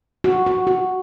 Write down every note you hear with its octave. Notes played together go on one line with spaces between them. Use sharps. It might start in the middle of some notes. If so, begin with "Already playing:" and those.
F#4
F#4
F#4